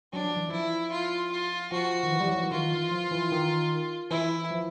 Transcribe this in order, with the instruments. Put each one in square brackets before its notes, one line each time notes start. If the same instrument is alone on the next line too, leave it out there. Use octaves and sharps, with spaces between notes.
[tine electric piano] F#3 [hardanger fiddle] D4
[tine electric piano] F3
E3
[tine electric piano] F3 [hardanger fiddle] E4
[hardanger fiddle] F4
F4
[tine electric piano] F3 [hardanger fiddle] F#4
[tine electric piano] D#3
E3
G3
F#3
F3
E3
[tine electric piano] D#3 [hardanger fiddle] F4
[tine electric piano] E3
F3
E3
D#3
[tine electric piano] E3 [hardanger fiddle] E4
[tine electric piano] F3